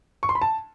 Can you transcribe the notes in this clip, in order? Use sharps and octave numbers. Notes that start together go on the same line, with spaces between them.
C#6
C6
B5
A5